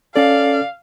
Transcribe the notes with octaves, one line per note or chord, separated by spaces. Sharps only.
C#4 A4 D5 F5